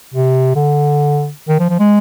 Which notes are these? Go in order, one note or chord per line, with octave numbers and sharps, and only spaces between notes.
C3
D3
D#3
F3
F3
G#3